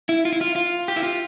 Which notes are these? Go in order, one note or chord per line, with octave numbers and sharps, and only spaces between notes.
E4
F4
E4
F4
F4
G4
E4
F4